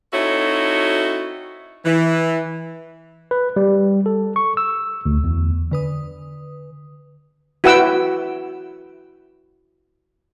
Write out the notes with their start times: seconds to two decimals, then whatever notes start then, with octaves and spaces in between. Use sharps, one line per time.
0.13 C4 D#4 E4 F#4 A4 C#5
1.85 E3
3.31 B4
3.56 G3
4.06 A4
4.36 C#6
4.57 E6
5.06 D2
5.24 E2
5.71 D3 B4 D#6
7.64 E4 F#4 B4 F#5 G5 E6